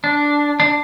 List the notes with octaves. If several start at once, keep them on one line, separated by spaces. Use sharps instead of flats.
D4
D4